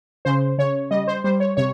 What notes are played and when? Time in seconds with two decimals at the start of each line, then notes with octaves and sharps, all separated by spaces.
0.25 C#3 C5
0.58 C#3 C#5
0.91 G3 D#5
1.07 C5
1.24 G3 C5
1.40 C#5
1.57 C3 C#5